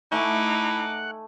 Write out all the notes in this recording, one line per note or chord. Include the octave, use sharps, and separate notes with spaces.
A3 D#4 E4 F#5 G#5 D6